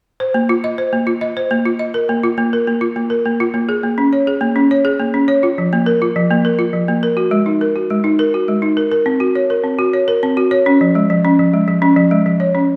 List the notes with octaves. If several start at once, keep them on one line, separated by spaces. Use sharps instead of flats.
C5
A#3
F4
D#5
C5
A#3
F4
D#5
C5
A#3
F4
D#5
A#4
A#3
F4
A#3
A#4
A#3
F4
A#3
A#4
A#3
F4
A#3
G#4
A#3
C#4
C#5
G#4
A#3
C#4
C#5
G#4
A#3
C#4
C#5
F4
F3
A#3
A#4
F4
F3
A#3
A#4
F4
F3
A#3
A#4
F#4
G#3
D#4
A#4
F#4
G#3
D#4
A#4
F#4
G#3
D#4
A#4
A#4
C4
F#4
C#5
A#4
C4
F#4
C#5
A#4
C4
F#4
C#5
C#4
F3
G#3
F3
C#4
F3
G#3
F3
C#4
F3
G#3
F3
C#5
C#4